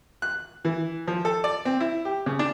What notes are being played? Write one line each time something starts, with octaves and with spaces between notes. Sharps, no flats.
F#6
E3
F3
A4
D5
C4
E4
G4
C#3
D4